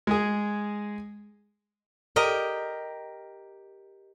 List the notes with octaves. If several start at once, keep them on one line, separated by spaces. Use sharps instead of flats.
G#3 G#4
G4 A#4 D#5